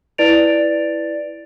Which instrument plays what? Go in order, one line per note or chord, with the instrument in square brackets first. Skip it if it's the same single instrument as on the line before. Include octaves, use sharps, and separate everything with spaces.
[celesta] E4 B4 D5 A6 D7 F7